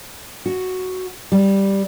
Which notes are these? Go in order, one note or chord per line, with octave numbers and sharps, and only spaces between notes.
F#4
G3